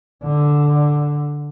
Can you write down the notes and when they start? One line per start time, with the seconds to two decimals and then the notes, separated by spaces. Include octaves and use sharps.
0.24 D3